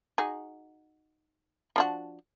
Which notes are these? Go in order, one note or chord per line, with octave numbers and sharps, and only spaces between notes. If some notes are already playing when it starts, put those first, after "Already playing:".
D#4 F#4 G#4
F3 D4 F#4